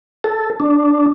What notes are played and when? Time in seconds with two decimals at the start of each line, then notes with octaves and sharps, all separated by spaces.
0.24 A4
0.60 D4